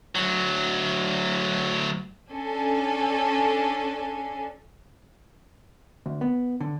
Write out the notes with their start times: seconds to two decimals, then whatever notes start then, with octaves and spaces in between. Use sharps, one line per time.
0.16 D2 F#3
2.31 C#4 D4 A4 G#5
6.06 D2
6.21 B3
6.61 D3